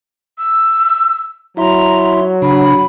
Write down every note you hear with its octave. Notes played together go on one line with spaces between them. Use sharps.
E6
F#3 E4 E5 A#5 C6
C#3 D4 B5